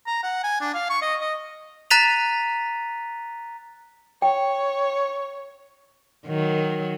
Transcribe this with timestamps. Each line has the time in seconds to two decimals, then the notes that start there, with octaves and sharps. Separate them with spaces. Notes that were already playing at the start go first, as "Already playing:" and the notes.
0.07 A#5
0.23 F#5
0.43 G#5
0.61 D4
0.74 F5
0.90 C#6
1.02 D#5
1.20 D#5
1.90 A#5 F#6 A6 B6 D#7 F7
4.22 C#5 G5
6.27 D#3 F#3